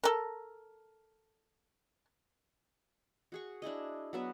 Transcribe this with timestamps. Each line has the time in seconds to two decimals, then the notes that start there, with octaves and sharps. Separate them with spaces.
0.04 A4 A#4
3.32 F#4 G#4 C#6
3.62 D4 E4 G#4 D#5
4.13 F#3 B3 E5